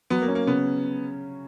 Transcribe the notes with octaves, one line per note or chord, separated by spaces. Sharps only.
F#3 B3
A#3
C#4
A#3
C#3 B3